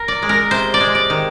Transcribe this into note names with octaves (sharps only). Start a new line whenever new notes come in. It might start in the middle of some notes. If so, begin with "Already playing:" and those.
Already playing: A#4
D5
G#3
A#4
C3 C5
D5
G#3
D5
D#3